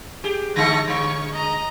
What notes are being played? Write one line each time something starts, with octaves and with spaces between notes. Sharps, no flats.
G4 G#4
D3 G#3 A3 A#6 C#7
D3 G#3 C#5 C#6
D#5 A#5